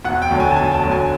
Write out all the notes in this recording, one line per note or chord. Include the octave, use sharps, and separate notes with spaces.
E1 F#5
G5
D2 D3 F#3
G#5
A5
E1 G#5
A5
D2 D3 F#3
G#5